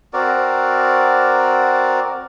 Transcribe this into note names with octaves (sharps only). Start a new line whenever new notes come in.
C4 F#4 A#4 D5